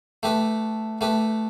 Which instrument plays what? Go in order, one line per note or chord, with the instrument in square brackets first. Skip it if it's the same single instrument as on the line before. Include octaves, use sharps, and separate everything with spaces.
[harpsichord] A3 G4 B4
A3 G4 B4